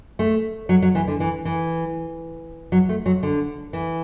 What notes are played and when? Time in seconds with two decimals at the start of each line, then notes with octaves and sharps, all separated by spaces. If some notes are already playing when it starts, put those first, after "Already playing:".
0.19 A3
0.69 F#3
0.82 F#3
0.95 E3
1.07 D3
1.20 E3
1.45 E3
2.72 F#3
2.89 A3
3.06 F#3
3.23 D3
3.73 E3